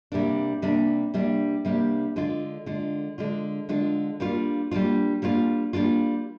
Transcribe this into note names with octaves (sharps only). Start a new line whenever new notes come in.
C3 G3 A#3 D4
C3 G3 A#3 D4
C3 G3 A#3 D4
C3 G3 A#3 D4
D3 G#3 D4 F4
D3 G#3 D4 F4
D3 G#3 D4 F4
D3 G#3 D4 F4
G3 A#3 D4 F4
G3 A#3 D4 F4
G3 A#3 D4 F4
G3 A#3 D4 F4